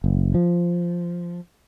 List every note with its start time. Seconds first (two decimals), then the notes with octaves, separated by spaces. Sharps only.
0.04 F#1
0.34 F3